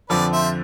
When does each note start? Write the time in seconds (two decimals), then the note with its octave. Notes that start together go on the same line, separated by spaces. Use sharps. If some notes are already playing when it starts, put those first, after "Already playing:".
0.09 F2 D3 F3 B4 D5
0.32 C5 E5